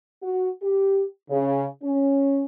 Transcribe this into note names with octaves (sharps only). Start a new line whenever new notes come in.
F#4
G4
C#3
C#4